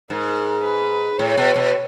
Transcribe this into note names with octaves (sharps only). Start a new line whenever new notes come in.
G#2 A#4
B4
A2 C#5
B2
B2